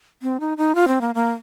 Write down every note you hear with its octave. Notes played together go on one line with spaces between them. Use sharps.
C4
D#4
D#4
F4
C4
A#3
A#3